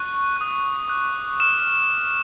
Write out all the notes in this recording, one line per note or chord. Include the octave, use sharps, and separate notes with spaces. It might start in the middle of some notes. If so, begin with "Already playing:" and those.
Already playing: C#6 F#6 D#7
D#6 F#6
D6 F#6
D6 F6 E7